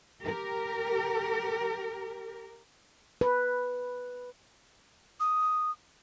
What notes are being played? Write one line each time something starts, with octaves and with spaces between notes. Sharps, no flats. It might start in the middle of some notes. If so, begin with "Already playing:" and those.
G4 A#4
B4
D#6